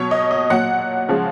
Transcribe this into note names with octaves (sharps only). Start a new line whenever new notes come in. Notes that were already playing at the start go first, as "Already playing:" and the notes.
Already playing: B2 F#3 C#5
D#5
D#5
A#2 F#3 F#5
C#3 F3 G#3